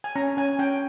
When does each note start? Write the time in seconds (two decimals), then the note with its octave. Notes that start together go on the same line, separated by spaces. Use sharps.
0.04 G#5
0.16 C#4 A#5
0.37 C#4 G#5
0.59 C#4 G5